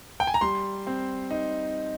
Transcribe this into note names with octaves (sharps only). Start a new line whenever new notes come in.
G5
G#5
A#5
G3 C6
C4
D#4